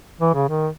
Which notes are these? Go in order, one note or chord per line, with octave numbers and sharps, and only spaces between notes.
E3
C#3
D#3